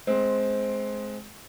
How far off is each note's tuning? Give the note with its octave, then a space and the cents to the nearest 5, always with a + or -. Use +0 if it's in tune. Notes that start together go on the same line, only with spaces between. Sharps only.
G#3 +25 C4 +0